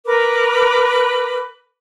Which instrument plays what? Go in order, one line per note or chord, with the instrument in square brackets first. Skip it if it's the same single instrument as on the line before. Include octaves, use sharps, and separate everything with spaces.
[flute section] A#4 B4 D6